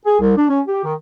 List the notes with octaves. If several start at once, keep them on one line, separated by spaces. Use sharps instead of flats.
G#4
C2
D4
C#4
G4
D#3